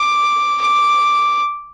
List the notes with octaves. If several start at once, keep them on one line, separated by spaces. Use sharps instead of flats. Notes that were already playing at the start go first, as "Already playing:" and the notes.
Already playing: D6
D6